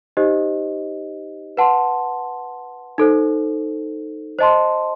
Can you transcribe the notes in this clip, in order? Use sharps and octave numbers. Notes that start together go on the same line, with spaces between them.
D#4 G4 C5 D#5
B4 F#5 A5 C6
D#4 A4 C5
C5 D#5 A5 C6